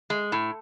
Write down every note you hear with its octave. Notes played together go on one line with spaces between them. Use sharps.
G#3
A2